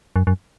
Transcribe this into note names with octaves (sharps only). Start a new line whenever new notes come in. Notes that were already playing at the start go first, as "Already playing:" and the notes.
F#2
F#2